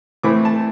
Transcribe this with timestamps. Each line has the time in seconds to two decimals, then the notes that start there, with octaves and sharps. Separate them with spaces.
0.23 A2 E3 A3 C4 E4 D6
0.45 A5